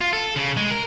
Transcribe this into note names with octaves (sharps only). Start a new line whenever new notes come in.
F4
A4
C#3
G#3
A#4